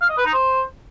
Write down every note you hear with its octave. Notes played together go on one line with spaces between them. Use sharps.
F5
D#5
B4
D#4
C5